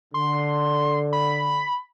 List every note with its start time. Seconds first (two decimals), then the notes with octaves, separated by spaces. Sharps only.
0.14 D3 C6
1.13 B5